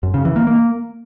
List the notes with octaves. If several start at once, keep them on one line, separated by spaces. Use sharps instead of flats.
F#2
C#3
E3
A#3
A#3